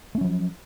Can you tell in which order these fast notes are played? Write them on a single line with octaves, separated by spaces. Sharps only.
A3 C#4 F#3 F3